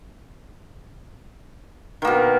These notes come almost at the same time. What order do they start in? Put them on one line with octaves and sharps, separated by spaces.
D#3 A#3 B2